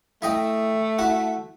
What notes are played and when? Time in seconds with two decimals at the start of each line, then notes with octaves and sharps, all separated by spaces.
0.22 A3 E4 D#5 G5
0.99 E4 F#4